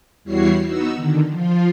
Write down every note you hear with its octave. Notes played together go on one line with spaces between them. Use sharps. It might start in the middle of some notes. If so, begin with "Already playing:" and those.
E2 G3 E4 F#4 C#5 C7
B3 D#4 F#4 E6
D3 D#3
F3 F4